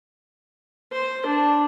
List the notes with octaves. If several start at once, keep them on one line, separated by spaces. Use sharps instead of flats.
C5
D4